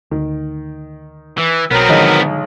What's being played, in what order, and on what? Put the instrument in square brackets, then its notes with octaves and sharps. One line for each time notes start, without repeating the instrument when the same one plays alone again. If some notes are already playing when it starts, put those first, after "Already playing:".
[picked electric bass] D2 [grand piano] D#3
[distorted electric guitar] E3
[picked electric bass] B1 [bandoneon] F#3 A#4 [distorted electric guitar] B3 C4
[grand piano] B1 G#2 G#3 [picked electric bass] D3 D#3 F3